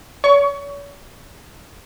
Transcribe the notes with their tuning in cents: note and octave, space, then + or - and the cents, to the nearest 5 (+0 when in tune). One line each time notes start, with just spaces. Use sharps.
C#5 +40 C#6 +20